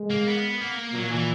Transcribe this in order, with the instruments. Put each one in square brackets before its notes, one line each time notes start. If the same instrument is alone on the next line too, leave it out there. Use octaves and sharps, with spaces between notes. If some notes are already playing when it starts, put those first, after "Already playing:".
Already playing: [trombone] G#3
[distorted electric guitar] A#3
B3
A#3
[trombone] A#2 [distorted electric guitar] F#3
[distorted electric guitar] E3